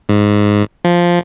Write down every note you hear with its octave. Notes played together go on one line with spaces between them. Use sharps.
G#2
F3